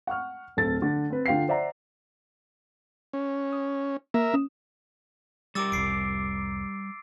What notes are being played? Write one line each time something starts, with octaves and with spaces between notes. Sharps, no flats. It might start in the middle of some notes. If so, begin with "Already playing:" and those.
F#5 C#6 F6
D1 C4 A4 A6
D3
C4 B4
D3 F4 F5 G5 C7
C5 D5 E5 F#5 A#5
C#4
D#6
A#3 A#4 E5
C#4 D#6 E7
G3 G4 A#4 D6 E6 A6
F1 C2 C7 D7